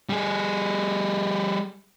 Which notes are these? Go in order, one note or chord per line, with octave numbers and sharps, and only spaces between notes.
G3 G#4